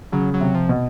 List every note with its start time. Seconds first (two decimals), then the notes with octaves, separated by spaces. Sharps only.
0.12 C#3 F#3
0.34 F#3
0.41 C3
0.55 F3
0.69 B2